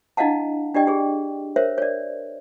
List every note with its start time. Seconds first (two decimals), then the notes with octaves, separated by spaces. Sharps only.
0.17 D4 E4 D#5 F5 F#5 A5
0.75 D4 G4 D5 D#5 G5
0.87 G4 G#4
1.56 A#4 C5 C#5 E5
1.78 C#5 D5